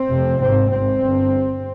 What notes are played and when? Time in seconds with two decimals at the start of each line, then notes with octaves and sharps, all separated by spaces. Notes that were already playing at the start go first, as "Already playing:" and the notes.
Already playing: C4
0.10 F1 F2 C3
0.40 G#1 G#2 C4
0.71 G#1 G#2 C4
1.00 G1 G2